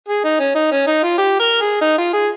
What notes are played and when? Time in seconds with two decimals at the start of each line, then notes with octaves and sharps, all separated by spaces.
0.08 G#4
0.24 D#4
0.39 C#4
0.55 D#4
0.72 C#4
0.87 D#4
1.03 F4
1.18 G4
1.40 A#4
1.61 G#4
1.81 D#4
1.98 F4
2.13 G#4